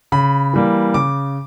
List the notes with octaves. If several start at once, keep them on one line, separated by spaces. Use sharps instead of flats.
C#3 B5
E3 G3 A#3
C#3 D6